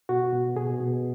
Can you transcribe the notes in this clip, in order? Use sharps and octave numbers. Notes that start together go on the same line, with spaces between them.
B2 F#4
B2
B2 G#4
B2